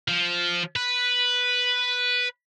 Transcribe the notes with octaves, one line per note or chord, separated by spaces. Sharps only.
F3
B4